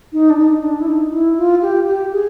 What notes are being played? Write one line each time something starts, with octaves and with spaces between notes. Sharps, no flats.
D#4
D4
D#4
D4
E4
D#4
E4
F4
G4
G4
G#4